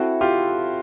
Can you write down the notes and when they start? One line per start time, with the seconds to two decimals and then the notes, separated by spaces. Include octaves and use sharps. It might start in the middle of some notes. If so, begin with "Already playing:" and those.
Already playing: C4 E4 F#4 A4 C5
0.21 F4 G4